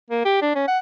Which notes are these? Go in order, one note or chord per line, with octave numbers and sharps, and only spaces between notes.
A#3
G4
D4
C#4
F#5